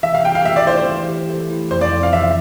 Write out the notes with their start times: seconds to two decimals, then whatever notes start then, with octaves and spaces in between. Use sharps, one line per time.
0.03 E3 E5
0.15 F5
0.25 G4 G5
0.35 F5
0.45 A3 E5
0.56 D5
0.66 E4 C5
0.77 C5
0.87 E3
1.08 G4
1.29 A3
1.50 E4
1.71 F2 C5
1.81 D5
1.92 F2
2.03 F5
2.13 E3 E5